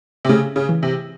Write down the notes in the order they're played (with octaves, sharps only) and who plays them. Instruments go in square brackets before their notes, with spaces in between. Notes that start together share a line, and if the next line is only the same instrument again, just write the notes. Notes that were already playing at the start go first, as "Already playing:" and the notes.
[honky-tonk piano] C3
[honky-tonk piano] C#3 [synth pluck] A3
[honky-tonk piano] C#3
[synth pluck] E3
[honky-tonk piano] C3